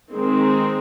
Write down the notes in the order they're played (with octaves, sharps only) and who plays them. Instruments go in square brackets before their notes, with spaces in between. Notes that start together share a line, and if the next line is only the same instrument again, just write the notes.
[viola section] D#3 G#3 C4